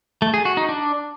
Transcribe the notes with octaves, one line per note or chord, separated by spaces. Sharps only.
A3
G#4
F#4
D#4
D4